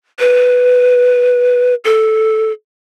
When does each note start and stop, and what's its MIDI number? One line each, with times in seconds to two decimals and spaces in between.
0.20 1.75 71
1.85 2.52 69